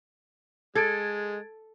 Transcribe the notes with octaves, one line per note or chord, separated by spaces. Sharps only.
G#3 A4 G#6 A6 D7